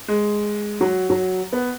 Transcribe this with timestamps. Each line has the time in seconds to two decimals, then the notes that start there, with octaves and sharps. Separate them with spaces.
0.08 G#3
0.81 F#3
1.10 F#3
1.52 B3